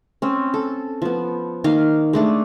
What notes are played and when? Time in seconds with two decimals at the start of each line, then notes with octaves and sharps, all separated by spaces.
0.22 C4 C#4
0.54 A4
1.02 F3 B3
1.64 D#3 A#3 D#5 F5
2.13 G#3 A3 D4